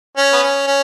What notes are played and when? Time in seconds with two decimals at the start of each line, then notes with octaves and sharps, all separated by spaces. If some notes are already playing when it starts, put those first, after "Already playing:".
0.17 C#4
0.33 B3
0.43 C#4
0.67 C#4